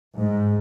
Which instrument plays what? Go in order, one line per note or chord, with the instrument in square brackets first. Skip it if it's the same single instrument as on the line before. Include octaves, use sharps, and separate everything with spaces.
[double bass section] G#2